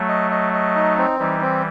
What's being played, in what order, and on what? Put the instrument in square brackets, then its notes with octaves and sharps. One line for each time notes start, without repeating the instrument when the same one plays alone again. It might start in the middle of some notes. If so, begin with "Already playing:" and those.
Already playing: [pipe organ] F#3 A3
[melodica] D#5
D#5
D#5
D#4
C4
[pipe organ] E3 G3 [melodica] D#4
[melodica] C4